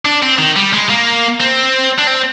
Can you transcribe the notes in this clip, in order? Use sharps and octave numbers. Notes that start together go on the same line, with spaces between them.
D4
C4
D#3
G3
G#3
A#3
C4
D4
C4